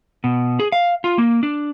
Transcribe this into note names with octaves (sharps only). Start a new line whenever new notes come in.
B2
G#4
F5
F4
A#3
D4